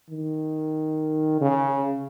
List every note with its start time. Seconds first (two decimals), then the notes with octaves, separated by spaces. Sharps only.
0.10 D#3
1.41 C#3